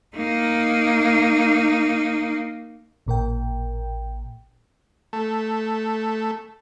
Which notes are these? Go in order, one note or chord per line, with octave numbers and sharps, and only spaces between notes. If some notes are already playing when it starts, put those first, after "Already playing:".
A#3 D#4
A1 A#2 A#4 G5
A3